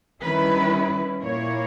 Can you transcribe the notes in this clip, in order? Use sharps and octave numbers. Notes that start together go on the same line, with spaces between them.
D#3 G3 C#4 E4 B4
A#2 A#3 E4 C#5